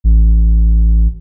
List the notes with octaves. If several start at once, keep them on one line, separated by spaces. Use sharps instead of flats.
A1